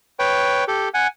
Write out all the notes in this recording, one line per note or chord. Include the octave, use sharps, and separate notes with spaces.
B4 C#5 G5
G4 A4
F#5 G#5